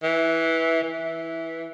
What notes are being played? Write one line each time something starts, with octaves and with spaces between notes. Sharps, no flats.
E3
E3